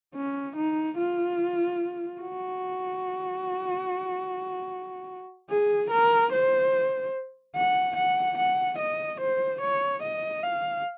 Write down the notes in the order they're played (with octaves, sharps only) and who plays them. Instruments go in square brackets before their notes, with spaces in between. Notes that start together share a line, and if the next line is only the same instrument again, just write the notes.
[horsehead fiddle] C#4
D#4
F4
F#4
G#4
A#4
C5
F#5
F#5
F#5
D#5
C5
C#5
D#5
F5